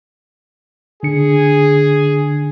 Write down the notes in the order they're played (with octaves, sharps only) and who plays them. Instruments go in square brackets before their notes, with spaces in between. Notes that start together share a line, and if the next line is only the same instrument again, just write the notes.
[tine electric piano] D3 D4 C#7 [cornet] G#4